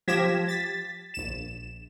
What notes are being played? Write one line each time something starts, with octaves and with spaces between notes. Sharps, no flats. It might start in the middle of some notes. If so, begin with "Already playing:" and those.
F3 G4 G#6 A#6 B6 E7
A6 B6
A#1 E7